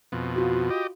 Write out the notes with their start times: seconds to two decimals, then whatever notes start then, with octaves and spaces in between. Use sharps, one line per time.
0.12 F2 B2
0.36 F4 F#4
0.70 G4 D#5